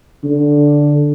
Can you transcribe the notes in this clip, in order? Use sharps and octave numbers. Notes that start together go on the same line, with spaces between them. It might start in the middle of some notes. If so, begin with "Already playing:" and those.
D3